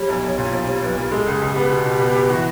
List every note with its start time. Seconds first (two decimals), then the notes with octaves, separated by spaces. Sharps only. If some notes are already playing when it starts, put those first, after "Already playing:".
Already playing: G3 C#5
0.09 B1
0.23 B1
0.38 A#2
0.43 C#5
0.53 B1 C5
0.68 G3 C#5
0.82 B1 B4
0.97 G3 A#4
1.12 G#3 A4
1.26 C#2
1.32 G#4
1.41 C#2
1.52 B3 G4
1.71 B2
1.86 B2
2.01 B3
2.15 B3
2.30 E3 F#4